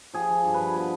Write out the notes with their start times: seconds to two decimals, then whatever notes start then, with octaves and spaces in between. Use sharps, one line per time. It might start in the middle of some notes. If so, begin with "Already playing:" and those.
0.13 F3 G#4
0.29 F3
0.44 G2
0.54 B4
0.60 F3
0.75 B2 B4